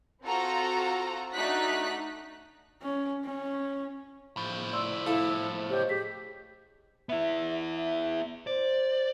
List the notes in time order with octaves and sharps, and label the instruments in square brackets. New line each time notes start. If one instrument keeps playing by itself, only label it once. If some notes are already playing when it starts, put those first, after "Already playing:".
[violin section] C4 F4 F#4 A4 A#5
A3 D4 D#4 F#4 F#6 B6
[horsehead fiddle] C#4
C#4
[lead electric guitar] A2 F3 [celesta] B5
[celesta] D5 C6 E6
[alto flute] E4 [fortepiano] A4 [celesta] F5
[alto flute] G4 [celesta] C5 C#5 D#5
[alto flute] G4 [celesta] G#4 B6
[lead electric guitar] B3 E4 [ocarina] E5
[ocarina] E5
[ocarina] C5 [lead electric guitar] D5